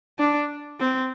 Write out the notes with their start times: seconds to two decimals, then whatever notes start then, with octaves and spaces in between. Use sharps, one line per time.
0.19 D4
0.80 C4